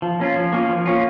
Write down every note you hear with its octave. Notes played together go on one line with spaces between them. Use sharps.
F3
A#3 C#4 F4
F3
A#3 C#4 F4
F3
A#3 C#4 F4